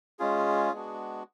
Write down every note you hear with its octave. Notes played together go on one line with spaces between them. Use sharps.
G#3 C#4 F4 G#4
G#3 B3 D4 F#4